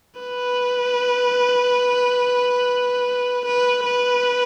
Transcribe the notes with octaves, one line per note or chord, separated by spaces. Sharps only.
B4
B4
B4